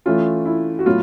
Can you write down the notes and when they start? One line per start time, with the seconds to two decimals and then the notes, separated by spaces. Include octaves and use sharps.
0.06 E3 A3 C#4 F4
0.45 E4
0.79 F#4
0.86 A2 F#3 B3 F4